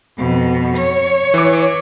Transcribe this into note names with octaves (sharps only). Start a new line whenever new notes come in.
F2 B2
C#5
E3 D6